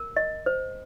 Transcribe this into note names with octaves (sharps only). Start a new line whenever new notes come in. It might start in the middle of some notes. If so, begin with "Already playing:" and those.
Already playing: A#4
D#5
C5